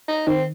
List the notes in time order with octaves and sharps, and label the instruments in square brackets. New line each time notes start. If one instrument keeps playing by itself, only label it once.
[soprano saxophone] D#4
[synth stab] D#3 [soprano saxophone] C4